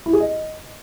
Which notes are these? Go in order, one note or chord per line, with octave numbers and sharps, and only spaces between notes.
E4
G#4
D#5